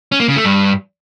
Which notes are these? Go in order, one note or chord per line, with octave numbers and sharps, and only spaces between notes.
C#4
A#3
C#3
A3
G2